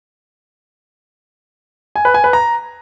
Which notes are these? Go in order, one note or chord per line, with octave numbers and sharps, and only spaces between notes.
G#5
B4
G#5
B4
A#5